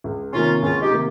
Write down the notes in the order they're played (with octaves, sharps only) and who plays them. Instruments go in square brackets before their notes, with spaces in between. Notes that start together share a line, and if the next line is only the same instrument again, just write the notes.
[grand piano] C#2
[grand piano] C3 D#3 A#3 [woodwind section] C#4 F4
[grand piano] C#2 [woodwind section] C#4 F4
[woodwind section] D#4 G4
[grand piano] C3 D#3 A#3